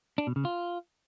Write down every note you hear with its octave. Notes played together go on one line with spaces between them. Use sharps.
D4
B2
C#3
F4